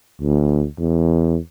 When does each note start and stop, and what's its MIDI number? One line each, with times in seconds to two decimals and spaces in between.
0.21 0.66 38
0.78 1.39 40